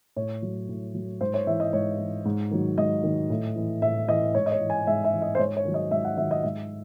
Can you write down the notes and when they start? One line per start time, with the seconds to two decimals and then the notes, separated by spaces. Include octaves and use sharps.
0.16 A2 C#5
0.42 F#3
0.69 A2
0.95 F#3
1.21 G#2 C5
1.34 C#5
1.47 E3 E5
1.60 D#5
1.73 G#2 C#5
1.99 E3
2.25 G#2
2.51 D#3 F#3
2.78 G#2 D#5
3.04 D#3 F#3
3.30 A2
3.56 E3
3.82 A2 E5
4.08 E3 D#5
4.35 G#2 C#5
4.46 D#5
4.52 C#5
4.61 E3
4.70 G#5
4.87 G#2 E5
5.04 E5
5.13 E3
5.22 D#5
5.35 C5
5.39 G#2 C#5
5.57 C#5
5.65 D#3 F#3
5.74 D#5
5.91 G#2 E5
6.05 F#5
6.17 D#3 F#3 E5
6.31 D#5
6.43 G#2 E5